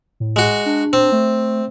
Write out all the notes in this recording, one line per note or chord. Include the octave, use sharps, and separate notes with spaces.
A2
G#3 F#4
D4
C4
A3